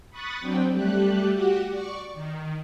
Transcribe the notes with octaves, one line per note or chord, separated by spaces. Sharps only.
B5 C#6 D#6 F#6 A6
F#3 C4 D4 G5
G3 A3 G4 F#6
F#4 G4 F#5
D5 C#6
D#3